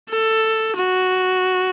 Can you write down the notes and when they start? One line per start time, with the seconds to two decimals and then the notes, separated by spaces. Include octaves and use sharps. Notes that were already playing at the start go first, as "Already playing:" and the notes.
0.10 A4
0.76 F#4